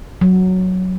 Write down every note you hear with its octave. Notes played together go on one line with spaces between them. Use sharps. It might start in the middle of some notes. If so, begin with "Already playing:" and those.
F#3